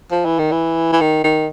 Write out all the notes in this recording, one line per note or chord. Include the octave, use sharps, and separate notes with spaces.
F3
E3
D#3
E3
E3
D#3
D#3